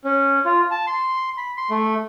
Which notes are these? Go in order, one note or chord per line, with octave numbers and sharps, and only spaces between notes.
C#4
F4
A5
C6
B5
C6
A3